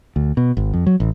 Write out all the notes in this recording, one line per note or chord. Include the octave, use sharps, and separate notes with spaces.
D2
B2
G#1
F2
F#3
A1